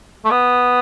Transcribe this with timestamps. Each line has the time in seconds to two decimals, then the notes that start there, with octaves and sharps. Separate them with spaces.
0.25 A3
0.31 B3